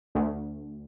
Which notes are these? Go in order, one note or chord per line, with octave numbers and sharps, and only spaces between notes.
D2